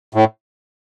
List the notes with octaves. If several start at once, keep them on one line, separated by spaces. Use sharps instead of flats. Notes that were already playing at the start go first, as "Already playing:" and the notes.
A2